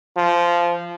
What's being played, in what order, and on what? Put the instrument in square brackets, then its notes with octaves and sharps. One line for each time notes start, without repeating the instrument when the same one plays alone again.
[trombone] F3